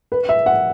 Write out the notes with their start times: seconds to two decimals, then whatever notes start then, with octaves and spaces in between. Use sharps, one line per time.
0.12 B4
0.29 E5
0.46 F#5